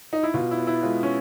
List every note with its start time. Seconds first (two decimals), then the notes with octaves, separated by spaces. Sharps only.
0.13 D#4
0.23 E4
0.34 B2 F4
0.51 E4
0.58 B3
0.67 E4
0.82 G#3 F4
1.03 C#4